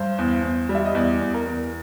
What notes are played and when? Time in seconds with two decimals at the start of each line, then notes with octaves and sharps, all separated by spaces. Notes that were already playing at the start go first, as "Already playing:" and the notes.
Already playing: G2 C5
0.18 E2
0.44 E2
0.69 G3
0.75 E5
0.85 D#5
0.95 E2 D5
1.21 E2
1.34 A#4
1.46 E2